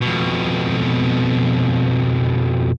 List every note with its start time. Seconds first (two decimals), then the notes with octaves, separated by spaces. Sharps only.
0.01 F2 B2